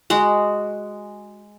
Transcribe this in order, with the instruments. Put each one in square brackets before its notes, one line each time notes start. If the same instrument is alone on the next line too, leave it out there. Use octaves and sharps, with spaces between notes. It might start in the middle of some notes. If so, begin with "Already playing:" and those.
[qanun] G#3 F#4 F#5